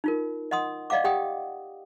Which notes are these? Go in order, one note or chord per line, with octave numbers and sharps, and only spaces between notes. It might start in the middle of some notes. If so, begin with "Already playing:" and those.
D#4 F4 A#4
D#5 F#5 C6 D#6
D5 D#5 F5 F#5 D6
G4 F#5 G5 D#6